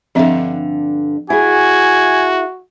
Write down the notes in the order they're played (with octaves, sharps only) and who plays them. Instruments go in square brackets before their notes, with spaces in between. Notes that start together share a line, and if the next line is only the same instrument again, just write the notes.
[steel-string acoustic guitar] G2 D3 [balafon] F3 C4 E5
[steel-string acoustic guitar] E4 G#4 [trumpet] F#4 [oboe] G#5